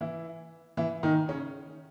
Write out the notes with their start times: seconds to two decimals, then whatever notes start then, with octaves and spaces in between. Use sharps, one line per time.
0.01 E3 E4
0.77 E3 E4
1.03 D#3 D#4
1.28 C#3 C#4